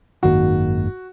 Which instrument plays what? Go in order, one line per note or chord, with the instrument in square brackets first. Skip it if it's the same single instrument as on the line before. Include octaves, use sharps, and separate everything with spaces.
[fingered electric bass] G#1 F#2 D#3 A#3 [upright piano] F#4